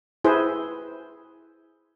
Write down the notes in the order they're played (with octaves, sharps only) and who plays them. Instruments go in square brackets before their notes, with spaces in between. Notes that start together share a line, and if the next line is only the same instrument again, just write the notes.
[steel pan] E4 G#4 B4 C5